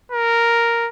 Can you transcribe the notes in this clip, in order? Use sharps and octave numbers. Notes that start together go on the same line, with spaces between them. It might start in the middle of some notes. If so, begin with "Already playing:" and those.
A#4